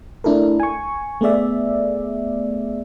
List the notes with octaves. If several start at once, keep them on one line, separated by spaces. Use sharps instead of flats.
A3 D4 E4 A4 A#4
G#5 C#6
A3 B3 G#4 D5 E5